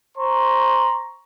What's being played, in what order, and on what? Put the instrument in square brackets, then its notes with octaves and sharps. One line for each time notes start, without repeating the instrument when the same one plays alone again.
[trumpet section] C5 A#5 C6 C#6